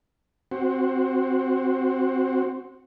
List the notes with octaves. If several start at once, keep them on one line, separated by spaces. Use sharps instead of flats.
C4 F#4